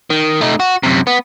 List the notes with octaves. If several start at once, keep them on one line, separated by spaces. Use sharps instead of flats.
D#3
A3 D#4
F#4
F#2 C3
B3